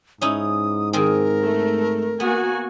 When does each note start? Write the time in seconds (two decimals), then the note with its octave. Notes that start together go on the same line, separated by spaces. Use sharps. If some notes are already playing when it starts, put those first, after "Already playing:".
0.21 G#2 C#4 D#4 E4 D#6
0.93 D#3 C4 G#4 A#4
1.43 A3
2.20 A#3 B3 F#4 G#5